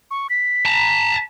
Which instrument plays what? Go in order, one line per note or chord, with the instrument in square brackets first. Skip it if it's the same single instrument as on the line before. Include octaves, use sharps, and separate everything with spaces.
[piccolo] C#6
B6
[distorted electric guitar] A5 A#5